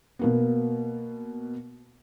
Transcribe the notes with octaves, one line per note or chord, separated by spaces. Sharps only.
B2 A#3 B3